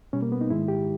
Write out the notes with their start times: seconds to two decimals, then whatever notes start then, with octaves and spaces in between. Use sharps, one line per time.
0.13 B2 G3 C#4
0.22 A#3
0.32 B3
0.41 D#4
0.50 G#2 D#3 G#3 E4
0.68 G4